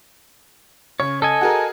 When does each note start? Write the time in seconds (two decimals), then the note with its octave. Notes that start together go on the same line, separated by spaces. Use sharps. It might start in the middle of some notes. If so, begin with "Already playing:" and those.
1.00 C#3 C#5
1.22 A4 D#5 G#5
1.41 F#4 G#4 A#4